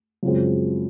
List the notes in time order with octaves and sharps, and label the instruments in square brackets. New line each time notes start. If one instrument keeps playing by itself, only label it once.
[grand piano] F#2 C#3 F3 G#3 C4